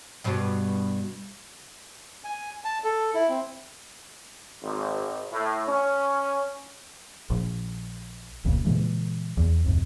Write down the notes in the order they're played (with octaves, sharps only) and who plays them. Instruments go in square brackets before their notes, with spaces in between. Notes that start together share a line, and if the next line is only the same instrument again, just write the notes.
[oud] G2 B2
[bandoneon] G#5
A5
A4
E4
C4
[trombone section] G#1
A2
C#4
[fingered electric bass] A#1
F1 C#2 A#2 C#3
A#2 C#3 E3 G#3
E2
D1 F2 G#2 C3